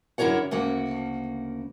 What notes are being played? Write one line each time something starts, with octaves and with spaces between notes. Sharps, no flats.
F#2 D3 E4 A#4 C#5 F#5
D2 C#3 A#3 F#5